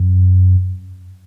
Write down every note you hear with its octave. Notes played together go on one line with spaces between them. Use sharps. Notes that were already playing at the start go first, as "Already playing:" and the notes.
Already playing: F#2